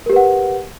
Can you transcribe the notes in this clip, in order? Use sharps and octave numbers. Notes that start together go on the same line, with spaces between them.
G4 A#4 B4 F#5